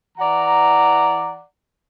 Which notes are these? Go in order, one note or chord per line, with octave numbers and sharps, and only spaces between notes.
E3 D5 F#5 A#5